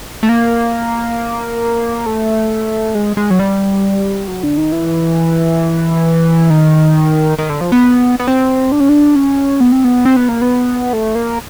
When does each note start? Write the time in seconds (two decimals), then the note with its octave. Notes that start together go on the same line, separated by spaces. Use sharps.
0.23 A3
0.29 A#3
2.06 A3
2.95 G#3
3.17 G#3
3.30 F#3
3.39 G3
4.28 F#3
4.43 D3
4.57 D#3
4.72 E3
6.50 D#3
7.38 D#3
7.49 D3
7.61 F3
7.72 B3
8.20 B3
8.27 C4
8.72 D4
8.80 C#4
8.89 D4
9.16 C#4
9.60 B3
9.72 C4
9.84 B3
10.05 C4
10.16 B3
10.29 A#3
10.41 B3
10.93 A3
11.15 A#3